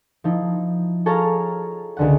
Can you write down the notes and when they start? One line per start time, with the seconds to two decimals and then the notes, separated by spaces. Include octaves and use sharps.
0.24 F3 D#4 E4
1.06 G#4 A4 C#5 F5 A#5
1.97 C#2 D3 F#5